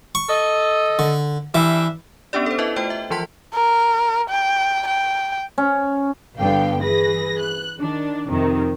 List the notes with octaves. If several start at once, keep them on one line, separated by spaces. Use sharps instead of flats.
C#6
A4 D#5
D3
E3 G3 D4 E5
B3 C#4 D4 G4 D5
A4 C5
E4 A4 B4 D#5 E5
A3 F4 C5 G5
E5
E3 F3 F4 A5 C6 B6
A#4
G5
G5
C#4
G1 G2 D3 B3 F5 G5
E3 G#4 B4 A#6
F#6
D#3 D4
F2 C3 D#3